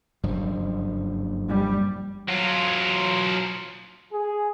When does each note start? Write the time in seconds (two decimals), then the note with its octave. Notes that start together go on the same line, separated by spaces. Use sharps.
0.23 F#1 G2 F3
1.48 G3
2.29 F#3 F4
4.13 G#4